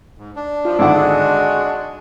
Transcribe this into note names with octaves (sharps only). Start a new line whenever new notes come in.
G#2
D4
F3 F4
G#1 D3 F3 E4 F#5 D6
G#3 F#4